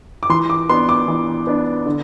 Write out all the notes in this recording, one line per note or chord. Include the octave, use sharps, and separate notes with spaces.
D6
E3 C6
D6
B3 D4 C6
D6
E3
B3 D4
D3